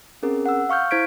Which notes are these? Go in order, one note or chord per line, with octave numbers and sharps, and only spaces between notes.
C4 C#4 G#4 A#4
F#5 E6
F5 C#6 F6 G6
E4 C5 G#6 B6 D7